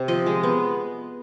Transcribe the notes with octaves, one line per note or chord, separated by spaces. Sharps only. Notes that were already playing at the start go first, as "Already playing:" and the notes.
Already playing: C3
F3 D#5
G#3
B3